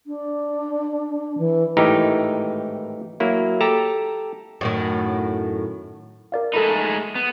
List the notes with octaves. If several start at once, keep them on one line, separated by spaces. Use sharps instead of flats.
D4
E3
G#1 A2 E3 D#4 G4 A#4
F#3 A#3 E4
G4 A4 A5 A#5
F#2 A2 D#3
A#4 D5 F5
G#3 A3 D#4 A4 B5
B3